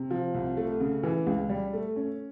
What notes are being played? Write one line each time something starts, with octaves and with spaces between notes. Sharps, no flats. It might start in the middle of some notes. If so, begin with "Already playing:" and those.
Already playing: C3
F3
C2
A3
C#3
E3
C#2
G3
A3
C#4